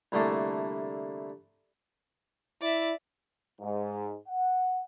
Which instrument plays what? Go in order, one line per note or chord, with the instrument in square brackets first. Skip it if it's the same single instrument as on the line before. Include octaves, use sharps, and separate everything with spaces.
[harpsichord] C2 D3 A3 A#3
[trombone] E4 [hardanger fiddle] D5 E5
[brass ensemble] G#2
F#5